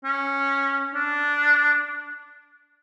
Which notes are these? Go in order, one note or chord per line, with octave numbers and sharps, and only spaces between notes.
C#4
D4